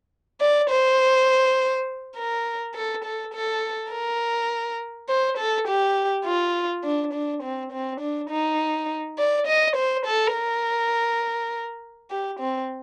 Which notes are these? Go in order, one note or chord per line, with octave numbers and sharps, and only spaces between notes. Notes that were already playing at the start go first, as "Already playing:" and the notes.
D5
C5
A#4
A4
A4
A4
A#4
C5
A4
G4
F4
D4
D4
C4
C4
D4
D#4
D5
D#5
C5
A4
A#4
G4
C4